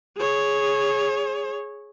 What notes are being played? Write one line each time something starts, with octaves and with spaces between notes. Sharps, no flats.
G#4 C#5